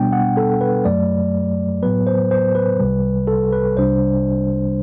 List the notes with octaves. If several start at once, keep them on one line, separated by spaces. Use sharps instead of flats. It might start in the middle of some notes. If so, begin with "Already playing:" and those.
Already playing: B2 G3 B3 D4 G5
F#5
A4
B4
F#2 F#3 A3 D5
A2 F#3 B3 B4
C5
C5
B4
C2 C3 G3
A4
B4
C2 C3 G3 D4 C5